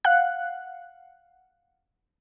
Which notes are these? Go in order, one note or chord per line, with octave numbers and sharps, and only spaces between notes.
F5 F#5 F#6